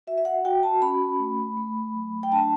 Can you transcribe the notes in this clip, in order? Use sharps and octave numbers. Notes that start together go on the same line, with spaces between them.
F#4 E5
E5
F#5
F#4 G5
A5
C#4 B5
A3
A3
F#3
G5
D4 A5